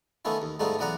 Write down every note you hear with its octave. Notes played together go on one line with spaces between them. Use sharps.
D#3 A3 B3 C#4 E4 F4
D#2
G#2 G3 A3 B3 D#4 F4
B1 E3 B3 D5 F#5 A#5